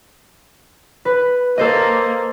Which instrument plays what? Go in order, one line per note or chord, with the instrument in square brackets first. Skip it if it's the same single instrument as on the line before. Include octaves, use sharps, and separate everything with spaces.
[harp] B4
[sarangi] A#3 [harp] A4 C5 D#5